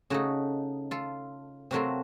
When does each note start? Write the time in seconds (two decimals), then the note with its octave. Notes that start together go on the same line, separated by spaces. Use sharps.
0.10 C#3 A3 D#4 F#4
0.91 F4 A4
1.71 C3 F#3 A3 C4 F4 F#4 A#4